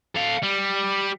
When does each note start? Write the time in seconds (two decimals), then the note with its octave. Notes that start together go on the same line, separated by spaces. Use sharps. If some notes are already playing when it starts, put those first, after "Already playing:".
0.16 A4 F5
0.43 G3